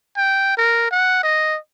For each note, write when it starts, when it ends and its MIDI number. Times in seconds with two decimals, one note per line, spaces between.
0.17 0.56 79
0.57 0.86 70
0.91 1.20 78
1.23 1.58 75